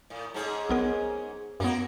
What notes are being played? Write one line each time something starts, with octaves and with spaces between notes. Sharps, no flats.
A2
G#2 C#4 G#4
B1 B3 A#4
F#2 A#3 B3 C#4 F#4